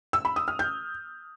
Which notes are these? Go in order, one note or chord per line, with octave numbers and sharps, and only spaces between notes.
E6
B5
D#6
F6
G6